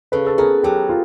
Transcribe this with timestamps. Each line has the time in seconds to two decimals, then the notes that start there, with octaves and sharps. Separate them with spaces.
0.12 C#3 A4 B4
0.27 A4
0.38 B3 G#4 A#4
0.63 F#3 G4 A4
0.89 F4